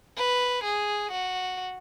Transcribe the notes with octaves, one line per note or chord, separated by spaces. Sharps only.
B4
G#4
F#4